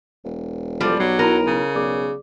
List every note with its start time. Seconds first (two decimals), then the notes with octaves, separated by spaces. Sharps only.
0.24 E1
0.81 F3 G3 A4 F6
1.00 B1 F#3 C7
1.19 E4 A#4 B5 D#7
1.47 C#3
1.75 B1 G#4 D5 D6